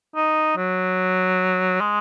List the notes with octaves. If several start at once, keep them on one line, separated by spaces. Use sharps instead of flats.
D#4
F#3
G#3